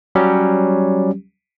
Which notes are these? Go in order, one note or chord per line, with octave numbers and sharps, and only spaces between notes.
F#3 G3 C#4 G4